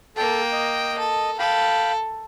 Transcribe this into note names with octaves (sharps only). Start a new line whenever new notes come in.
A#3 A4 G5 A5
D#5
A4
A4 F5 G5 B5